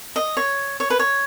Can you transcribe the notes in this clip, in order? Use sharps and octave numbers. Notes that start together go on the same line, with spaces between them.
D#5
C#5
C#5
B4
C#5